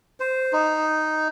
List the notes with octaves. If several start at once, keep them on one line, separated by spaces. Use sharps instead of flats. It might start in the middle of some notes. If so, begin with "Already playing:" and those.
C5
D#4